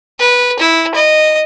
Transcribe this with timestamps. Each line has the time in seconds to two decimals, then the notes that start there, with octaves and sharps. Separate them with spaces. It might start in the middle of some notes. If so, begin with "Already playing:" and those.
0.19 B4
0.59 E4
0.94 D#5